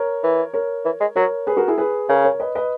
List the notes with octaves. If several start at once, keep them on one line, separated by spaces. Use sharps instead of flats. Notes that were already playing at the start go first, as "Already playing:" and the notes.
Already playing: A#4 C#5
E3
A#4 C#5
E3
G#3
F#3 A#4 C#5
G#4 B4
F#4 A#4
E4 G#4
G#4 B4
C#3 A#4 C#5
A#4 C#5
B4 D#5
B4 D#5